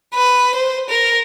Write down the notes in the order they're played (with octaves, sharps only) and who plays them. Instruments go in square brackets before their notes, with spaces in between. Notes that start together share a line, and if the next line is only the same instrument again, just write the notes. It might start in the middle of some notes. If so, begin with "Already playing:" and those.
[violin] B4
C5
A#4